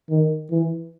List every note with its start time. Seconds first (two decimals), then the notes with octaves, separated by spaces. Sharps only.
0.10 D#3
0.51 E3